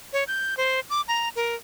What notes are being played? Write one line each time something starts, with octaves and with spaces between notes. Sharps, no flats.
C#5
G6
C5
D6
A#5
A#4